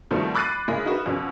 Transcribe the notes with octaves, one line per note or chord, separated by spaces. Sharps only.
B2 D#3 F3 G3 A3 C4
B5 D6 F#6 A6 C7 D#7
C#3 G#3 E4 G#4 A#4
D#4 F#4 A#4 B4
F2 B2 C#4